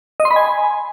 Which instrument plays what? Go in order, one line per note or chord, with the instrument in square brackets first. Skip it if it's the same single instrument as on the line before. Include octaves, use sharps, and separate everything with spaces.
[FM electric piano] D#5
C6
B5
G#5